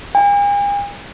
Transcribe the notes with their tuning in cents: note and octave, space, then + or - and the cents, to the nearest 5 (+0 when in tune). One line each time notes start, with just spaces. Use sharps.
G#5 -45